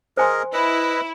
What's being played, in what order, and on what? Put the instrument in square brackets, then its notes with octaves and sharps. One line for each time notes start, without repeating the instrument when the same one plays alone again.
[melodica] G#4 A#4 D#5 [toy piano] C5 G#5 C6
[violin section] E4 [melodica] B4 D#5 E6